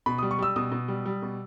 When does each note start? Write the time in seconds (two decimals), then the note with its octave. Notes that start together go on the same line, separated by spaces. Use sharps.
0.06 B2 B5
0.18 G3 D#6
0.31 C#6
0.39 G3 E6
0.56 B2 D#6
0.72 B2
0.88 G3
1.06 G3
1.22 B2